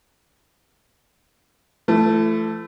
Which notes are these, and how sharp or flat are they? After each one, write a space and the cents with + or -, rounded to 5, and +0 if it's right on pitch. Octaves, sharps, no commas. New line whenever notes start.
E3 +40 A3 +0